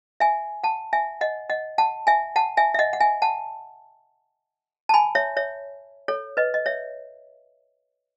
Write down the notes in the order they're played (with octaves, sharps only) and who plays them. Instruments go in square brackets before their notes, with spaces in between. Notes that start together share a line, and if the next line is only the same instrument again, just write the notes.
[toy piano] E5 G#5
F#5 A5
E5 G#5
D#5 F#5
D#5 F#5
F#5 A5
E5 G#5
F#5 A5
E5 G#5
E5
D#5 F#5
F#5
E5 G#5
F#5 A5
A5
G#5 B5
C#5 E5
C#5 E5
A4 C#5
B4 D#5
D#5
C#5 E5